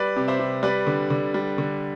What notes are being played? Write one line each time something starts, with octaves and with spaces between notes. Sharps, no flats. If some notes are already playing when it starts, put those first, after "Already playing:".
Already playing: G3 B4 D5
C3
C5 E5
C3
G3 B4 D5
D3
D3
G3
D3